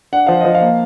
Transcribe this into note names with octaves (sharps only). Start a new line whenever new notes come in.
D4 F#5
F3 F5
F3 D#5
F5
A#3